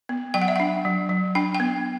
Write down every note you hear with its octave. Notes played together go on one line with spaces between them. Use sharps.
B3
F#3 G5
F#5
E5
D4 F#5
F#3
F#3
D4 G5
G5
B3